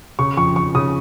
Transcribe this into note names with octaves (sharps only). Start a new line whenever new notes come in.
C#3 C#6
F2 C#6
F2 C#6
C#3 D#6